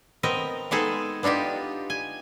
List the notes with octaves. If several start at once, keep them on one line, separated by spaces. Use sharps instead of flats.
B3 C4 A#4 D#5
G#3 B3 D#4 G#4 A4
B3 D4 D#4 F4 G4
G#5